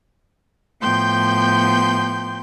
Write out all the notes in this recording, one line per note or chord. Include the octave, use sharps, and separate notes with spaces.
A2 F3 B3 G5 C6 G6